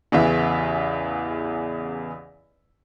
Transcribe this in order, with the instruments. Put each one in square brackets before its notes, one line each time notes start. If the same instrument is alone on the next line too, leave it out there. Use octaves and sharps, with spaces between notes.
[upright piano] A1 E2 C#3 E3 E5